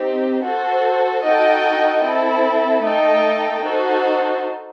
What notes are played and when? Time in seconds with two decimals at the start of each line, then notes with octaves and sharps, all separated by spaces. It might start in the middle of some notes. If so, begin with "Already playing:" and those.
Already playing: C4 D#4 G4
0.44 F#4 A4 C5
1.23 D#4 F#4 A4 D#5 G5
2.03 C4 E4 A4
2.82 A3 D#4 A4 D#5 G5
3.63 D#4 F#4 A4 C5